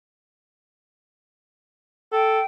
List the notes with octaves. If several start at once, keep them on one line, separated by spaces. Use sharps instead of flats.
A4 G5